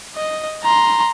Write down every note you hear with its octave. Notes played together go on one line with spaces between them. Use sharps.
D#5
A#5 C6